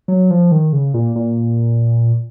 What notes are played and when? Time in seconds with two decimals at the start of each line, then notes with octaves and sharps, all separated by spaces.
0.08 F#3
0.30 F3
0.52 D#3
0.73 C#3
0.94 A#2
1.16 A#2